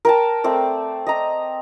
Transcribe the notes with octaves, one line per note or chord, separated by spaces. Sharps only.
A#4 G5 A5
A3 C4 D5
D#5 A#5